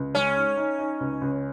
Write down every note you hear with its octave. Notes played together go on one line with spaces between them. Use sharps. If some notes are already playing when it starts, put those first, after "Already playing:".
Already playing: C#2
G#3 C#4
D#4
D#4
D#4
C#2
C#2